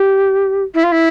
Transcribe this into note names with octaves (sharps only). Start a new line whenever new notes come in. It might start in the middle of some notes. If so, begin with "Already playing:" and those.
Already playing: G4
E4
F4
E4